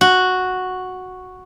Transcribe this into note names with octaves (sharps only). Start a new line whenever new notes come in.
F#4